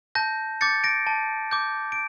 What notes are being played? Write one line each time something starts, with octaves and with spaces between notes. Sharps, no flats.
A5 G6 A#6
D6 G6 A6 C#7
A#6 D7
A5
D6 G6
D7